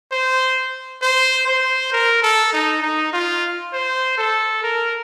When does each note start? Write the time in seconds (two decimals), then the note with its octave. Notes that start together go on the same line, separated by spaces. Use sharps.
0.12 C5
1.02 C5
1.48 C5
1.92 A#4
2.23 A4
2.53 D#4
2.82 D#4
3.13 F4
3.73 C5
4.18 A4
4.63 A#4